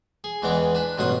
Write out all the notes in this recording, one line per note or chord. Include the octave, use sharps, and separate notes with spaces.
G#4
E2 E3 G#3 B3 G5 D6
D4 B4
A1 G2 B2 F#3 F4 D#6